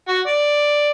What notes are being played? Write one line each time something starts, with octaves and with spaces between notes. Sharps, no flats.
F#4
D5